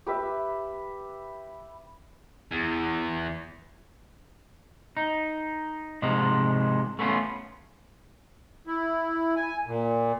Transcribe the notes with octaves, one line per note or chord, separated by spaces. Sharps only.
G4 B4 E5
E2
D#4
G#2 C3 F3 G#3
A3 B3 C#4 F4
E4
G#5
A#2